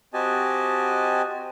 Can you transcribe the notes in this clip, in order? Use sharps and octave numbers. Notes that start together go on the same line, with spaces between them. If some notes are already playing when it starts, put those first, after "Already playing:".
C4 F#4 G4 D#5 G#5 A5